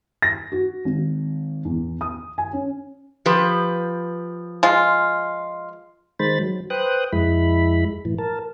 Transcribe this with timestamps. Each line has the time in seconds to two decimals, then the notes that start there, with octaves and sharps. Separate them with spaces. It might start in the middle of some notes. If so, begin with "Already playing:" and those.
0.22 A#6
0.52 F#4
0.85 G#1
1.65 E2
2.01 D#6
2.38 G#5
2.53 C#4
3.26 F3 G4 B4
4.63 G#3 F4
6.19 D#3 G#3 C5 B5 A6
6.40 F#3
6.70 B4 C5 G5 D#6 F#6
7.12 F2 G#3 E4 B5
8.05 A2 E3
8.18 A#4 A5